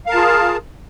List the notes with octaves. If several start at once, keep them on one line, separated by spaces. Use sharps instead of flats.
F4 G#4 A#4 F5 A5